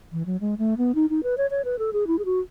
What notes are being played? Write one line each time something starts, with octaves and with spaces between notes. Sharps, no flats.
E3
F#3
G#3
A3
B3
D#4
D#4
B4
C#5
C#5
B4
A4
G#4
E4
G#4
F#4